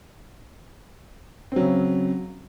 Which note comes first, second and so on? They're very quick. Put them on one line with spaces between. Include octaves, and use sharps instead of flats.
C4 F#3 C#3